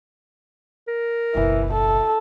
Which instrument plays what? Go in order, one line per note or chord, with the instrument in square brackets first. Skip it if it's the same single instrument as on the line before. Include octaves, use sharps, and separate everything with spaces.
[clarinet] A#4
[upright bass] F#1 B1 [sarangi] E3
[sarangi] A4